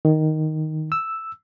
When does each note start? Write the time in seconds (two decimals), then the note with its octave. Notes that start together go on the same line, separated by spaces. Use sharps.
0.05 D#3
0.92 E6